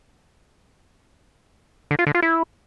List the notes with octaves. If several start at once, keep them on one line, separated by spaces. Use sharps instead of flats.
D3
F4
D3
F4
E4